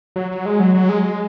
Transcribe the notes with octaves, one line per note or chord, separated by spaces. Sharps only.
F#3
F#3
G#3
F#3
F#3
G#3
G#3